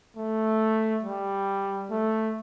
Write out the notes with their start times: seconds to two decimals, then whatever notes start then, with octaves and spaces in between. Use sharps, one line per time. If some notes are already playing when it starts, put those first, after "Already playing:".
0.17 A3
1.04 G3
1.91 A3